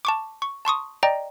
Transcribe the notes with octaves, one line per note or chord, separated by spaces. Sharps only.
A5 C#6 D6
C#6
A5 C6 C#6 D#6
D5 D#5 G5 A#5